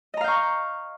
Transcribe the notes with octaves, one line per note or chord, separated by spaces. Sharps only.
D#5 F5 A#5 C#6 G6